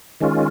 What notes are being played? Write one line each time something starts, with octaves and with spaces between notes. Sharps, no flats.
D#3 G#3 C#4 F4